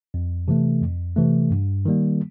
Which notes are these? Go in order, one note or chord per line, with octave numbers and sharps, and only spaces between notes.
F2
C3 E3 A3
F2
C3 E3 A3
G2
D#3 G3 A#3